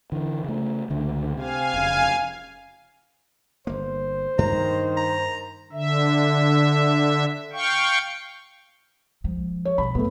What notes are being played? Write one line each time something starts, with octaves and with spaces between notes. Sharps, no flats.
D3 E3
C#3 A3
C#2 D3 A3
C3 F5 G#5
F1 C#3
G1 A#3 C5
G2 D#3 A#3 A#5
A#5
D3 E5
F5 G5 C#6
F3 G#3
C#5
B1 B5
G#2 A3 B3